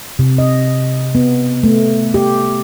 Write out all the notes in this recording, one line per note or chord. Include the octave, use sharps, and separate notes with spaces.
C3
D#5
B3
A3
G4